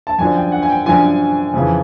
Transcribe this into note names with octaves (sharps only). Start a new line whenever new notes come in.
A5
F#2 D3 F3 G#5
G5
F#5
G#5
G5
F#2 D3 F3 G#5
F2 C#3 E3